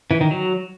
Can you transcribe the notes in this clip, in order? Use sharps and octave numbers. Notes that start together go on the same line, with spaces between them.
E3
D#3
F#3